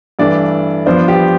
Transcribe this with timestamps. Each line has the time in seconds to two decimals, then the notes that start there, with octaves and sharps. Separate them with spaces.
0.19 G2 E3 A3 D4 D5
0.86 G2 F3 B3 D4 C5
1.08 G4